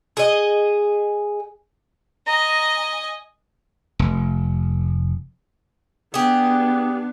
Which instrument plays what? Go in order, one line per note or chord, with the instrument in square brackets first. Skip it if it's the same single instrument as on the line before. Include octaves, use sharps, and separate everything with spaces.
[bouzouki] G#4 D#5
[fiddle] D#5 G#5 [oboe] A#5
[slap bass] F1
[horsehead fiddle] B3 D4 [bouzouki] G4 G#4